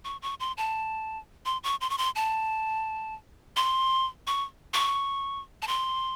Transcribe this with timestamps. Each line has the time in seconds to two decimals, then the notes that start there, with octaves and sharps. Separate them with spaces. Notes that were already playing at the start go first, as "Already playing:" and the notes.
0.05 C#6
0.22 C#6
0.40 C6
0.57 A5
1.45 C6
1.64 C#6
1.81 C6
1.90 C#6
1.98 C6
2.16 A5
3.56 C6
4.27 C#6
4.74 C#6
5.62 A5
5.68 C6